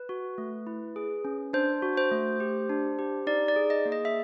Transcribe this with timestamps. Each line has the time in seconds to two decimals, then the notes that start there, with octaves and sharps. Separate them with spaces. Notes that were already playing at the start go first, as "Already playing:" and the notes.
Already playing: B4
0.09 F#4
0.38 A3
0.67 E4
0.96 G#4
1.25 C#4
1.53 D4 C5
1.82 F#4
1.98 C5
2.11 A3
2.40 G4
2.70 D4
2.99 G4
3.27 D#4 D5
3.48 D5
3.56 G#4
3.70 D#5
3.85 A#3
3.92 D#5
4.05 E5